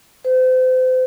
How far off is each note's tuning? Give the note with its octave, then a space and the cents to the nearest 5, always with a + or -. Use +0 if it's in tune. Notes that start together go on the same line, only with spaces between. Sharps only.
C5 -35